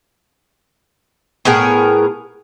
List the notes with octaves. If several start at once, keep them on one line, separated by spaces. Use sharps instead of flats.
A2 B3 G#4 A#4